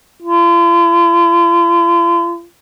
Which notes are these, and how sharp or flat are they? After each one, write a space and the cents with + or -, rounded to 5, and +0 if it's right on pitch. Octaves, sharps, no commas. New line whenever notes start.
F4 -45